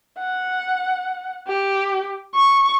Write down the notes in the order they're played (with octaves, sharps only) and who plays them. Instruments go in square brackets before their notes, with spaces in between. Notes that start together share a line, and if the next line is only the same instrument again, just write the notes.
[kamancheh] F#5
G4
C#6